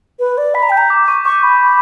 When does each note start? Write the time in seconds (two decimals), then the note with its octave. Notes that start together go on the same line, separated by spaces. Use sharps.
0.19 B4
0.38 D5
0.55 B5 B6
0.63 A#5
0.70 G5 G6
0.77 A#5
0.90 D6
1.08 C#6
1.25 C#6 D6
1.43 B5